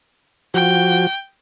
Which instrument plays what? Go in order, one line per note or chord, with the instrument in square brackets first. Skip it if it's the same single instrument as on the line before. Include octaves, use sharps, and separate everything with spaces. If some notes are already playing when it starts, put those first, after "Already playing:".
[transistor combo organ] F3 F#4 [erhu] G5